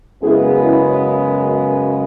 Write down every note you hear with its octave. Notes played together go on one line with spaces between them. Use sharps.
F#2 C#3 G#3 B3 E4 G#4
C#4 E4